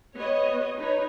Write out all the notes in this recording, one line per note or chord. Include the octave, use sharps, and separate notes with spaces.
B3 G4 C#5 D#5
D#4 B4 C#5